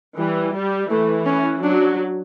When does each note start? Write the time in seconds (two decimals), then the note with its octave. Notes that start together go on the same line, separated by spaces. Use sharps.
0.17 E3 G3
0.54 G3
0.90 E3 A3
1.26 C#4
1.63 F#3 D4